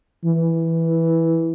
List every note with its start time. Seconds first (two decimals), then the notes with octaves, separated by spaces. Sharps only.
0.25 E3